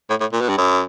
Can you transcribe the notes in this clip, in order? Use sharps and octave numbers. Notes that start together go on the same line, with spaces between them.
A2
A2
A#2
B2
G2
F#2